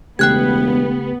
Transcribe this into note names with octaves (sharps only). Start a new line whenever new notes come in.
E1 C#3 A3 B3 G4 G5 F#6 G#6